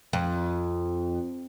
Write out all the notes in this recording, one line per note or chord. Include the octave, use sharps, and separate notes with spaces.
F2